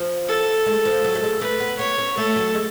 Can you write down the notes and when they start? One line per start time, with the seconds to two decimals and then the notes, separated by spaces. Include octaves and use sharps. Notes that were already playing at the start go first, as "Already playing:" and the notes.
Already playing: F3
0.28 A4
0.66 G#3
0.85 F3
1.04 F#3
1.15 A3
1.23 G#3
1.41 A3 B4
1.60 B3
1.79 B3 C#5
1.98 C#4
2.17 A3 A4
2.36 F#3
2.55 G#3